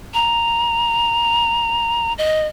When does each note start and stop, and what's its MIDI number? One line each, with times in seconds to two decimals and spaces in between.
0.14 2.13 82
2.18 2.47 75